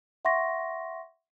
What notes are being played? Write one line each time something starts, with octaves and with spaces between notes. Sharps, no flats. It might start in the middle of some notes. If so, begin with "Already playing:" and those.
E5 F#5 C6 C#6 A#6